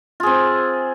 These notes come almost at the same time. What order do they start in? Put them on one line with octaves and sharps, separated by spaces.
F4 G#4 C4